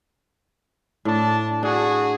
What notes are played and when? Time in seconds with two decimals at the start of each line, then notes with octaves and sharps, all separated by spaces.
1.05 A2 D4 A5
1.63 D4 F#4 G#4